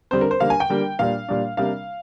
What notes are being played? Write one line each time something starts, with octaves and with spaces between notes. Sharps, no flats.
D3 G3 C4 C5
A#4
C5
D3 G3 A#3 F5
G#5
G5
D3 G3 A#3
A#2 G3 D4 F5
A#2 G3 D4
C3 G3 A#3 D4 F5